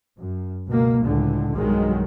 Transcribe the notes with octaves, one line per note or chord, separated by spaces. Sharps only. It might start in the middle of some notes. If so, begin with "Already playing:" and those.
F#2
C#2 B2 A#3
C#2 A2 D3
B1 G2 D#3 F#3 G#3